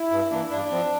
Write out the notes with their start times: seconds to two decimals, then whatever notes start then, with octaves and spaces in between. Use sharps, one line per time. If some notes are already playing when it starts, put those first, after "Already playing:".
Already playing: E4
0.11 G2
0.31 E3 A#3 D4
0.50 G2 D4
0.71 F3 C4